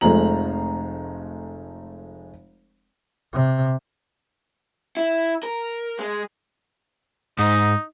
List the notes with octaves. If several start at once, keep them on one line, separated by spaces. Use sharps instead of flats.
F1 F3 G#3 A3 A#5 F#7
C3
E4
A#4
G#3
G#2 D#4